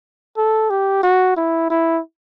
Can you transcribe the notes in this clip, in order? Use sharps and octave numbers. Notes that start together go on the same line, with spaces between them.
A4
G4
F#4
E4
E4